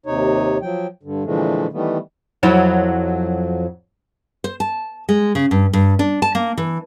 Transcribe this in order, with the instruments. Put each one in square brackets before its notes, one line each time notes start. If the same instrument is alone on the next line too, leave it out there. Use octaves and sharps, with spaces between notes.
[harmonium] D#2 C3 D#4 C#5
F3 F#3 G5
G2 D3
A#2 D3 E3 F3 G#3 A3
D#3 E3 G3 A3 B3
[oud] F2 F#3 E4
[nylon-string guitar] C5
A5
G#3
C#3
G2
G2
D4
A5
A#3
E3